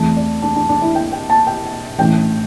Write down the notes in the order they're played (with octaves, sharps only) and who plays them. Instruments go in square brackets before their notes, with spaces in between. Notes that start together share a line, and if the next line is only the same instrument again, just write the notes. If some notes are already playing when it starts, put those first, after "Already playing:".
Already playing: [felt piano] E2 E3 A3 C4 A5
D5
D4
D4
D4
E4
G5
G5
A5
G5
A1 A2 A3 D4 G5